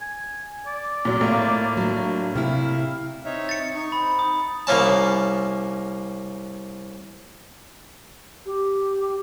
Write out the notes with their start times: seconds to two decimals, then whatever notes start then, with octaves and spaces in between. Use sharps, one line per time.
0.02 G#5
0.67 D5
1.05 A#2 F#3
1.21 A2 A#3 F4
1.77 F#3 D4
2.35 C3 E4 F5
3.25 C4 D#4 C#5 E5
3.49 A6 C#7
3.75 D#4 C#6
3.92 C4 B5
4.19 D#6
4.67 C2 A#3 C#4 A5
8.45 G4